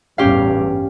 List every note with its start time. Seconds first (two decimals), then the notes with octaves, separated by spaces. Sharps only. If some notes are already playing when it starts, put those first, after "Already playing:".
0.18 A1 E2 G2 C#4 G4 F5